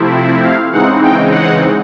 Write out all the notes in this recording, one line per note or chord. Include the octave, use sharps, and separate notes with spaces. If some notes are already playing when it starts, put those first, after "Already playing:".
Already playing: C3 F3 A3 C4 E4
F5
C#3 E3 G#3 C4 D#4 F#5
G5
F#5